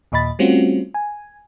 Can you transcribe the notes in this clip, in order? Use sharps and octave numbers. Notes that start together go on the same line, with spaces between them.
D#2 A#2 D#5 B5 A6
G3 A3 C4 C#4 F4 F#4
G#5